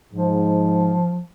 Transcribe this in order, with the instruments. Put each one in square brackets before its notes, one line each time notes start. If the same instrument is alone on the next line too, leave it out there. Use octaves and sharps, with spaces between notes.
[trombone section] G#2 [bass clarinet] F3